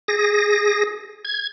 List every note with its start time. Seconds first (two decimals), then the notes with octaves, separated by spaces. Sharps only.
0.08 G#4 A#6
1.25 G#6